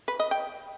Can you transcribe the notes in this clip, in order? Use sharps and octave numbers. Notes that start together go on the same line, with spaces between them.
B4
D#5
G5